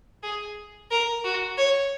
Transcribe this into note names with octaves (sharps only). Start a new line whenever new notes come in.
G#4
A#4
F#4
C#5